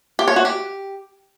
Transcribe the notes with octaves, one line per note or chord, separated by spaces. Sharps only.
G4
C#5
F#4
G4